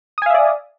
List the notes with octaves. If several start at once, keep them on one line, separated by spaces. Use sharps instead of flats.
D5 E5 F5 G#5 D#6